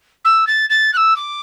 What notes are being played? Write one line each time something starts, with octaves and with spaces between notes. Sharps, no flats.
E6
A6
A6
F#6
E6
D6